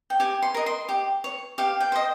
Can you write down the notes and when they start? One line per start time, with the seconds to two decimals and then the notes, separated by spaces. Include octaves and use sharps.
0.10 G5
0.20 G4 G#5
0.42 C6
0.54 A#4 D#5
0.66 C6
0.89 G4
1.24 C#5
1.58 G4 F5
1.80 G5
1.92 C5 D#5